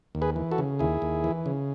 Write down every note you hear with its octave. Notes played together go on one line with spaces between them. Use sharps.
D#2
G#4 B4
E3
F#4 A4
C#3
D#2 E4 G#4
D#2
E3
C#3